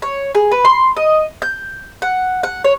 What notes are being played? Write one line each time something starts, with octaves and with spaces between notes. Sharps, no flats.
C#5
G#4
B4
C6
D#5
G6
F#5
F#5
C#5